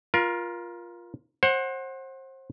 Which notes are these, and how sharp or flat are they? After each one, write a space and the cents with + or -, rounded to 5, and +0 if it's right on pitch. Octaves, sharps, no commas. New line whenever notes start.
F4 +0 A#4 +30
C5 +30 F#5 +0